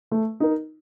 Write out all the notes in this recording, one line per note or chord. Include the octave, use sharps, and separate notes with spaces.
A3
D#4 A#4